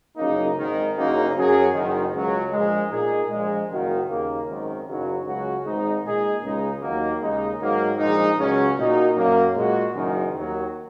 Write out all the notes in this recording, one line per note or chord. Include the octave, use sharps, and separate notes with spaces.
F#1 F#2 C#3 A#3 D#4
G#1 G#2 D#3
F#1 F#2 C#3 A#3 D#4
F#2 F#3 C#4 G#4
F#1 F#2 D#3
C#2 C#3 F#3
A#1 A#2 G#3
A#2 A#3 D#4 G#4
A#1 A#2 G#3
F#1 F#2 D#3 A#3 F#4
D#2 C#3 A#3
G#1 F#2 D#3
F#1 F#2 C#3 F#3 D#4
C#2 C#3 F#3 C#4 F#4
G#1 G#2 G#3 D#4
A#2 G#3 D#4 G#4
C#2 C#3 G#3 D#4
D#2 D#3 F#3 A#3
D#2 C#3 G#3 D#4
G#2 D#3 F#3 A#3
A#1 A#2 G#3 D#4
C#2 C#3 F#3 C#4
A#2 A#3 D#4 F#4
F#2 F#3 A#3
A#2 G#3 F#4
F#1 F#2 D#3
D#2 D#3 F#3